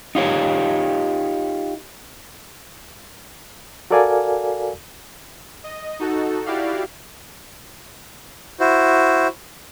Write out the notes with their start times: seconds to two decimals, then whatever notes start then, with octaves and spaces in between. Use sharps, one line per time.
0.15 D#4 F4 G4 C#5
3.91 F#4 A4 A#4 D5 F5 G#5
5.64 D#5
5.99 D#4 F#4 A4
6.46 E4 F#4 G4 D5 F5
8.60 E4 F#4 C5